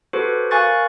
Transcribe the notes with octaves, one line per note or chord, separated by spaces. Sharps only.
F#4 G4 A4 B4 C5
A#4 F5 G#5 C#6 F#6 A6